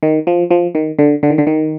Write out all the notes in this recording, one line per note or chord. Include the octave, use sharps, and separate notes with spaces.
D#3
F3
F3
D#3
D3
D3
D#3
D3
D#3